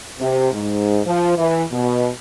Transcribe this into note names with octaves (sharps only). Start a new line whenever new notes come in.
C3
G#2
F3
E3
B2